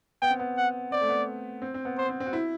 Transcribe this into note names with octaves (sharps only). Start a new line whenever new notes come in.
B3 G5
C4
B3
F#5
C4 D5
A3
B3
C4
C4
B3
B3 C5
C4
C4
F#4
E4